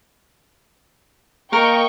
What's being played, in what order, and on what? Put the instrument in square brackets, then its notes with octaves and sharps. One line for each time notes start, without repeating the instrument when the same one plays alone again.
[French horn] A#3 [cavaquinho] A#4 [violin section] D#5 G5 C#6